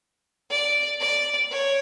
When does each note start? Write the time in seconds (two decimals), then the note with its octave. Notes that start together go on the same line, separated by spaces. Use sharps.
0.51 D5
1.00 D5
1.51 C#5